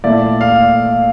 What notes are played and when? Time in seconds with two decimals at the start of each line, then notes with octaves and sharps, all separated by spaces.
0.04 A#2 A3 E4 D5
0.41 F5